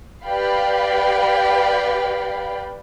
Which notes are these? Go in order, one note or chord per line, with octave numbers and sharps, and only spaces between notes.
G4 B4 D5 F5 G5 B5